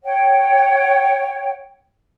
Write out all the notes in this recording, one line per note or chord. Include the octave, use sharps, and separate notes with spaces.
C#5 F#5 G5